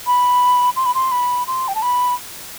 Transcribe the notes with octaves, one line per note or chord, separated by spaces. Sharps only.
B5
C6
B5
C6
B5
C6
G5
A5
B5